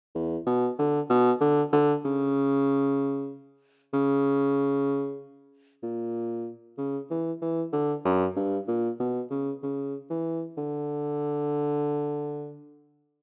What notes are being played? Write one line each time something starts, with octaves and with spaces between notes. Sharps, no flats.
E2
B2
D3
B2
D3
D3
C#3
C#3
A#2
C#3
E3
E3
D3
F#2
G2
A#2
B2
C#3
C#3
E3
D3